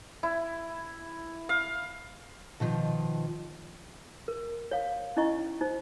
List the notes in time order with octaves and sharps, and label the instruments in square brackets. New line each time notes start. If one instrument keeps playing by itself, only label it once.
[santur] E4
F5
[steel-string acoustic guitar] B2 D#3 F3
[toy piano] A#4
C#5 F5
C#4 D#4 E4 D#5 C#6
D#4 C5